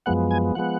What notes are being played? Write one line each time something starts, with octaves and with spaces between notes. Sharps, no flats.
F#2 F3 G#3 B3 F#5
G#5
F3 G#3 B3 F#5